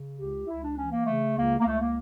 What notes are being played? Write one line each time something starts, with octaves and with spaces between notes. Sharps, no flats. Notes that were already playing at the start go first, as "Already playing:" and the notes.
Already playing: C#3
C#2 G4
C#2 E4
D4
E3 C#4
A#3
C#3 A3
C#2 A#3
A#3
C#2 A3
A#3